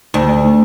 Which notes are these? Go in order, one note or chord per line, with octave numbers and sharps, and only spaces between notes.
D2